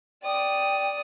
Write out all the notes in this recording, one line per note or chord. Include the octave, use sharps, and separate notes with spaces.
D5 G5 D#6